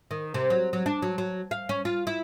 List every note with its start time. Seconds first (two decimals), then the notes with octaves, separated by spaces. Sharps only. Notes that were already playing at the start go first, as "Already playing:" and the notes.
0.11 D#3
0.34 C3
0.50 F#3
0.73 F#3
0.86 D4
1.02 F#3
1.18 F#3
1.51 F5
1.69 C#4
1.85 F4
2.07 E4